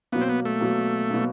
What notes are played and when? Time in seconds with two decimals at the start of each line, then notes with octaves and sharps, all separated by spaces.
0.12 B2 F#3 A#3 B3
0.21 C4
0.29 B3
0.45 A3
0.61 B2 F#3 A#3
1.10 B2 F#3 A#3